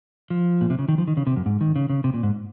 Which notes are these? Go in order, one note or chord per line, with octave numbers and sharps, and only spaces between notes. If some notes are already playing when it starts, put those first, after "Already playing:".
F3
A#2
C3
C#3
D#3
F3
D#3
C#3
C3
F#2
G#2
D#3
C#3
C#3
C3
A#2
G#2